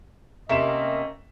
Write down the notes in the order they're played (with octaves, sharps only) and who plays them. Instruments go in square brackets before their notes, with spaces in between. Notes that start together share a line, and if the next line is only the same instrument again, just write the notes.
[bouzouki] C3 A#3 [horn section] D#3 A3 C#4 [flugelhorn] D#5 [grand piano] E5 E7